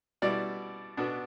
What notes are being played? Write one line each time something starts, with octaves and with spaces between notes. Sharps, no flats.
B2 G3 E4 D5
B2 B3 D4